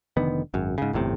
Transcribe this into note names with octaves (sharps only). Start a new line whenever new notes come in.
F1 D3 D#3 B3
G#1 F#2
G#2 C#3
G1 E2 A2 C3